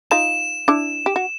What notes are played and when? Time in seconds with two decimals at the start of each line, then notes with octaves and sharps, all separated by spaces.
0.11 D#4 F4 E7
0.68 D4 E4
1.06 G4
1.16 F#4